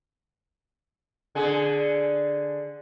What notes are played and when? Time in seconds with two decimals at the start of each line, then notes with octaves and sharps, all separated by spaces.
1.35 D3 G#4